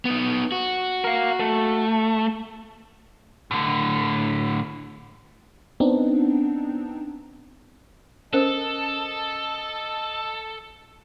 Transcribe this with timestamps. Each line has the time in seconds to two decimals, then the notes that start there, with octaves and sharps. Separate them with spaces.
0.05 B3 D#4
0.52 F#4
1.04 A#4 F5
1.40 A3
3.51 A2 D3
5.80 B3 C4 D4 D#4
8.33 C#4 A4 A#4 C5 D#5 A5